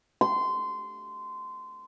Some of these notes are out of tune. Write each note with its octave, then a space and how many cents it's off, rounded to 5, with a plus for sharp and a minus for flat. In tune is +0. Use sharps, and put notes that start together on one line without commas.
C6 -20